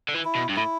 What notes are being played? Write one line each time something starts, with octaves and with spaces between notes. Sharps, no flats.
D3
E3
E4
B2
G2
A2 E4